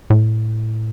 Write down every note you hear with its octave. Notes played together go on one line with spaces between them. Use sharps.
A2